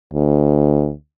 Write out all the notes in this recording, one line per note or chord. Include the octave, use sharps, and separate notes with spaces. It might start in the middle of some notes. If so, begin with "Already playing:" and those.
D2